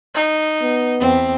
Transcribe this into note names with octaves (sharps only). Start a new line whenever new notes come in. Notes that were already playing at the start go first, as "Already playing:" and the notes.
D#4
B3
E2 C4